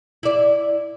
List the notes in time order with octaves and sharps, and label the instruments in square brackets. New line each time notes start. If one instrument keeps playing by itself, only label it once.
[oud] E4 D5